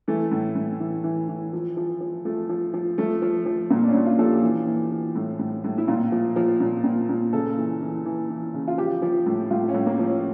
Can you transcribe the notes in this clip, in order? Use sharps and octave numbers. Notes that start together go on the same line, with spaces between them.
E3 A3
A2
A2
E3
E3
E3
F3
F3
F3
F3 A3
F3
F3
F3 A3
F3
F3
A#2 A#3
D4
C#4
A#2
F4
F3 A4
G4
E3
E3
E3
A2
A2
A2
E4
A#2 F4
F3
F3
A#2
A#2
A#2
C#3 A4
E3
E3
E3
E3
C#3
F4
F3 G4
F3
A2
A2 F4
C#4
A2
A#3
F3
C#4